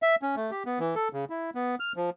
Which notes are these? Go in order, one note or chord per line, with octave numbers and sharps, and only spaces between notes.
E5
C#4
A3
G4
B3
E3
A4
C#3
E4
B3
F6
F3